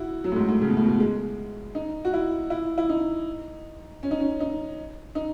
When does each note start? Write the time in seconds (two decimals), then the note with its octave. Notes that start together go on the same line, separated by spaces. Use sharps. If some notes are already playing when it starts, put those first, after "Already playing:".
Already playing: E4 F#4
0.24 F#3
0.32 A2
0.36 G#2
0.49 A2
0.62 C#3
0.69 B2
0.77 A2
0.86 B2
1.00 G#3
1.75 D#4
2.05 F#4
2.13 E4
2.50 E4
2.78 E4
2.89 D#4
4.03 C#4
4.11 D#4
4.20 C#4
4.40 D#4
5.15 D#4